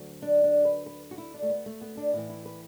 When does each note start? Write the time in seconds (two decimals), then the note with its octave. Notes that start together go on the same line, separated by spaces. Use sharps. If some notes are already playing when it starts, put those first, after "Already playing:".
Already playing: D2 D3 F#3
0.22 D4
0.44 D4
0.65 B4
0.86 B4
1.11 F#4
1.18 E4
1.34 D4
1.42 A3
1.50 B3
1.66 A3
1.81 B3
1.97 D4
2.13 A2 E3 E4
2.30 E4
2.46 B4